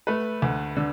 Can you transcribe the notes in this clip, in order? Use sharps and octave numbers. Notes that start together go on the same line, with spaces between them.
A3 B4
D2
D3